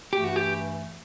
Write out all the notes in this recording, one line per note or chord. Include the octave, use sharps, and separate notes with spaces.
G2 E3 A3 G4
F#4
G4